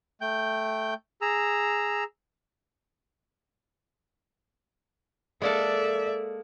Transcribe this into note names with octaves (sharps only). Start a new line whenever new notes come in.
A3 G5 G6
G#4 A#5 E6
G#3 A#3 A4 D5 E5